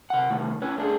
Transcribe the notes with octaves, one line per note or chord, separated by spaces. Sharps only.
C3 F#5
C3 D#3 A3
C#4 B4 C#5
A3 D4 G#4